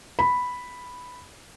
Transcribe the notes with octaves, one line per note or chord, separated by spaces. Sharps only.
B5